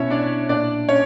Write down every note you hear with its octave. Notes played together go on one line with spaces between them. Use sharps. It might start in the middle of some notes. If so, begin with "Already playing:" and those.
Already playing: B2 C#4 E4 C#5 E5
D4 D5
A#2 D4 D5
C#4 C#5